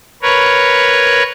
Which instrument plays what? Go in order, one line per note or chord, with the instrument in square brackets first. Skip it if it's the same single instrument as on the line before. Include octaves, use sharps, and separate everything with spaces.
[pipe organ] A#4 B4 C#5